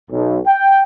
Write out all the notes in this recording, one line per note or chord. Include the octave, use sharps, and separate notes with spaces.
B1
G5